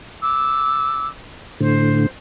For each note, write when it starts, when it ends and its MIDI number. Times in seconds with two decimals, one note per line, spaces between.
0.22 1.08 86
0.22 1.08 88
1.60 2.07 45
1.60 2.07 50
1.60 2.07 72